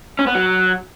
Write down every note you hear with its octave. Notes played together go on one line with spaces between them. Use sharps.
C#4
B3
F#3